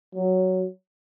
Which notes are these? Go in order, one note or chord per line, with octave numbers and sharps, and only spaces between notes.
F#3